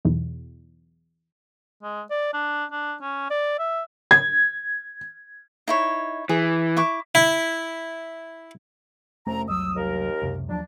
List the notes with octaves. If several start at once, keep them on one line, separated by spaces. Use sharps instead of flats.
B1 E2
G#3
D5
D4
D4
C#4
D5
E5
G#6
D#4 E4 C#5
E3 G#4
E4 C#6 D6
E4
F1 C2 A3 C4 C#4 A#5
F1 C2 F#3 D#6 E6
D#2 A#4
C#2 F#2 C3
D#2 F3 F#3 D4